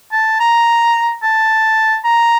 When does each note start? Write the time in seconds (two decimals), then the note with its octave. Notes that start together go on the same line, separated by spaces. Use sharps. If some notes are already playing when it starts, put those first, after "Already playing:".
0.12 A5
0.40 A#5
1.23 A5
2.05 A#5